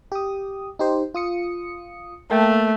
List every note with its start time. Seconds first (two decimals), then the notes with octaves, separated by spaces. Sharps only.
0.12 G4 D#6
0.79 D#4 G4 C5
1.14 F4 D#6 C#7
2.31 A3 A#3 G5 A5